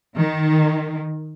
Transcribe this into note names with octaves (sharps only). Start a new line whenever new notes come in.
D#3